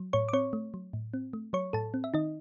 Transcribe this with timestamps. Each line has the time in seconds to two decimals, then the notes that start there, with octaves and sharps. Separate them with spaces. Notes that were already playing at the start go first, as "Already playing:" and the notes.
Already playing: F#3
0.13 A2 C#5 C#6
0.29 D6
0.33 C4 C#5 C#6
0.53 A3
0.74 F#3
0.93 A2
1.14 C4
1.33 A3
1.53 F#3 C#5 C#6
1.73 A2 A4 A5
1.94 C4
2.04 E5
2.14 D#3 D#4 D#5